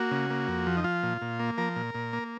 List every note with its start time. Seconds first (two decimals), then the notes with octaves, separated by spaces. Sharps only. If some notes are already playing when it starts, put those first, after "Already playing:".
Already playing: A#3 F#4
0.11 C#3
0.30 A#3
0.48 F2
0.67 F3
0.77 D#4
0.84 F3 F4
1.03 A#2
1.21 A#2
1.40 A#3
1.58 F3 A#4
1.76 A#2
1.94 A#2
2.13 A#3